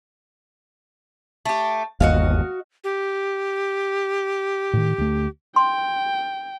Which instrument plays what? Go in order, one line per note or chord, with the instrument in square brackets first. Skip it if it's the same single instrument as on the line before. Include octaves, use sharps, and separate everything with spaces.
[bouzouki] A3 G4
[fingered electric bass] G1 D#2 [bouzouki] F#4 D#5 F5
[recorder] G4
[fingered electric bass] A2 D#3
D2 A3
[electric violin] G5 [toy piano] C6